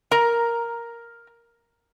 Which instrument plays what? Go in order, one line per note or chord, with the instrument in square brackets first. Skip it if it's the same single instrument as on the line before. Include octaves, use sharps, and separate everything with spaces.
[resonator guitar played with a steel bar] A#4 A#5